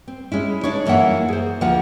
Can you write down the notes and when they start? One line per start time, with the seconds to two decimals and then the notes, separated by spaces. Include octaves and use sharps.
0.08 C4
0.32 G#3 C#4 E4
0.63 D4 D#4 C#5
0.85 F#2 E3 A#3 E5 F#5
1.28 G#4 C5
1.61 D2 F3 A#3 D4 F#5